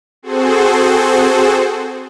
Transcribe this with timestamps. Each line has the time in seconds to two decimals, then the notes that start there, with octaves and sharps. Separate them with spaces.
0.22 C4 F#4 G#4 A4 C5